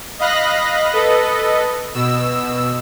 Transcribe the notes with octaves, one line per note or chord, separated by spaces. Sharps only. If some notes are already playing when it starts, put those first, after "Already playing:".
D#5 F5 B5 F#6 A#6
A4 B4 D#5
B2 E6